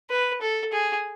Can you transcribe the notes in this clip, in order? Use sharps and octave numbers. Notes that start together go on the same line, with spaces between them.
B4
A4
G#4